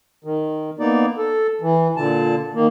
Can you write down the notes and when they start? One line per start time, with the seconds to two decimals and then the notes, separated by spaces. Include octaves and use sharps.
0.24 D#3
0.79 A#3 B3 D#4 D5
1.17 A4
1.61 E3
1.97 A#2 D3 A5
2.55 D#3 A#3